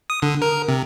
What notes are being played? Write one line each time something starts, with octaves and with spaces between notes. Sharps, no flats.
D#6
D3
A#4
C3